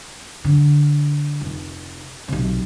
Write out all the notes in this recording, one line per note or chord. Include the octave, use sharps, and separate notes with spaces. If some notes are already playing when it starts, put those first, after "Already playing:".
D3
F1
B1 C3